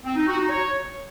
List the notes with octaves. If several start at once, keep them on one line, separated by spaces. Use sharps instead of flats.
C4
D#4
F#4
D#4
C#5